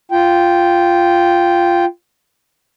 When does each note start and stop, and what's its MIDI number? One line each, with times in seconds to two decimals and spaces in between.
0.12 1.85 65
0.12 1.85 79